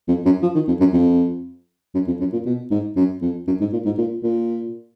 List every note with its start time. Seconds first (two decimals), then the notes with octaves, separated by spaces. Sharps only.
0.08 F2
0.26 F#2
0.42 F3
0.55 D#3
0.68 F2
0.80 F#2
0.93 F2
1.95 F#2
2.07 F2
2.20 F#2
2.33 A#2
2.46 B2
2.71 G#2
2.96 F#2
3.22 F2
3.47 F#2
3.61 G#2
3.73 A#2
3.86 G#2
3.98 A#2
4.24 A#2